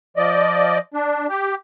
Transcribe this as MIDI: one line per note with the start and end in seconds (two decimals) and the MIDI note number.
0.17 0.78 53
0.17 0.78 74
0.17 0.78 75
0.94 1.27 62
1.29 1.55 67